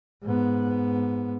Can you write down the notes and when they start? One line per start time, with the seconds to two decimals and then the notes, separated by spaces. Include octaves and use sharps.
0.23 G#2 B3